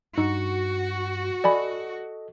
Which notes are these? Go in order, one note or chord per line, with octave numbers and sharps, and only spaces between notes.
G2 D#4 F#4 C#6 C#7
A4 D5 D#5 G#5 B5